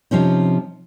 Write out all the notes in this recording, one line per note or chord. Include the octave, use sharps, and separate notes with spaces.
C3 F3 C#4 D#4